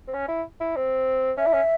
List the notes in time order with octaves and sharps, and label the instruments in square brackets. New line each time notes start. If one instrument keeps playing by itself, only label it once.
[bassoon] C4
C#4
E4
E4
C4
[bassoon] C#4 [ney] E5
[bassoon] E4
C#4